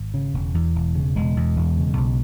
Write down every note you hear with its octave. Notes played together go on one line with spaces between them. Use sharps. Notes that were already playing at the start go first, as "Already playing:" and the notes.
Already playing: G#1
C#3
E1
E2
E1
C#3
E1 G#3
E2
E1
C#3
B1